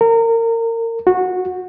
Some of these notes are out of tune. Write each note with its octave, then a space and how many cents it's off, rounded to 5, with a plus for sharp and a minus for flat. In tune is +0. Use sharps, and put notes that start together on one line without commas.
A#4 -30
F#4 -15